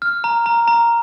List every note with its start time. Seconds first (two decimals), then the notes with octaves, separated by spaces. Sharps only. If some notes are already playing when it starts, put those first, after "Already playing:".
0.02 F6
0.24 A#5
0.46 A#5
0.68 A#5